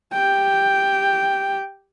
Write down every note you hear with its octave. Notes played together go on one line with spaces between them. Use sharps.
G4 G5